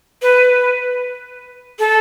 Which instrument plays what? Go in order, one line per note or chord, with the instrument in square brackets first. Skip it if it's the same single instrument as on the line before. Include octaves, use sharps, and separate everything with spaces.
[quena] B4
A4